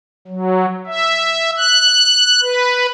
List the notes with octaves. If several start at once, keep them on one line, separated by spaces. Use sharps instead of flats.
F#3
E5
F#6
B4